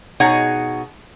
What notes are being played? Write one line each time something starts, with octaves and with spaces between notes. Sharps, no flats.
B2 D#4 G#4 C#5 F#5